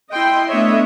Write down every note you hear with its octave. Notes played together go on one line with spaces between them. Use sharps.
E4 D#5 G5 C6
A3 B3 D4 C#5 D#5 E5